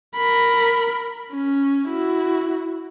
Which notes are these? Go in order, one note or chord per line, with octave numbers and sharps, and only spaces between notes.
A#4 B5
C#4
E4 F#4